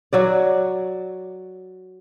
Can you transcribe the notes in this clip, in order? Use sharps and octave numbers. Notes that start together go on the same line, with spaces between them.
F#3 F#4 D5